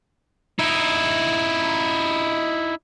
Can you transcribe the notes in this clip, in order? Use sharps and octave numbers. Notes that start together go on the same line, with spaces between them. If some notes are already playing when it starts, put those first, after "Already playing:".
D#4 E4